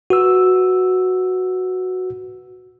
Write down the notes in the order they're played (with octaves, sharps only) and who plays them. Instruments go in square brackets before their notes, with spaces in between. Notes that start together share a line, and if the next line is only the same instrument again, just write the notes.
[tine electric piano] F#4 B4 E6